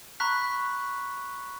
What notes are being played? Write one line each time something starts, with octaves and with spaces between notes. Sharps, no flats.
A#5 B5 C#6 F6 F#6 B6